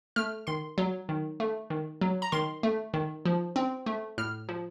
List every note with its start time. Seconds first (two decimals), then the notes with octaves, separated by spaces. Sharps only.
0.16 A3 F6
0.47 D#3 C6
0.78 F#3
1.09 D#3
1.40 A3
1.70 D#3
2.01 F#3
2.22 A#5
2.32 D#3 C6
2.63 A3
2.94 D#3
3.26 F3
3.56 C4
3.86 A3
4.18 A2 F6
4.49 F3